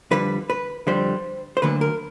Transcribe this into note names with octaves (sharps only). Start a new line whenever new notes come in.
F2 D3 G3 B4
B4
F2 D3 G3 C5
C5
D2 D3 F#3 A#3 B4
A#4